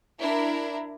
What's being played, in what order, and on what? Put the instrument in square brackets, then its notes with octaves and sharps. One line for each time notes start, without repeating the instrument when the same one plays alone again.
[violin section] D4 E4 A#4